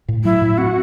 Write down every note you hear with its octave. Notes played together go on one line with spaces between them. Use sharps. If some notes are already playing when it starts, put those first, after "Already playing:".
A2
F#3 E4
A2
C4 F#4